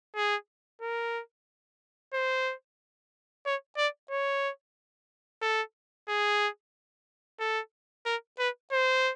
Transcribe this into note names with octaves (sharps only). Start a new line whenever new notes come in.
G#4
A#4
C5
C#5
D5
C#5
A4
G#4
A4
A#4
B4
C5